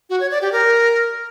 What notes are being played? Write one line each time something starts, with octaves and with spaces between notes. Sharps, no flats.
F#4
C#5
D5
G4
A#4